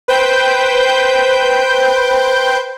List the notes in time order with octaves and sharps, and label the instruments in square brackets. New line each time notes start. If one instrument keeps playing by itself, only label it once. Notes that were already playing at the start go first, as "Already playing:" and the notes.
[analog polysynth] B4 C5 G5 G6